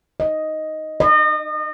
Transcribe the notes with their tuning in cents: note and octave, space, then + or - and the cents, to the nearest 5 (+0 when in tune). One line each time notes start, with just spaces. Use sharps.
D#5 +5
D#5 -35